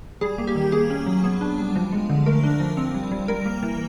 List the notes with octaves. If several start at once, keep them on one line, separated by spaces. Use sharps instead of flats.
G3 G#4
A#3
G4
D#3
A#3 G#4
C#4
F#3
B3
D4
G3
F3
G#3
D3
A3 A#4
D4
F3
C4
G3
G3
G3 A#4
A#3
E3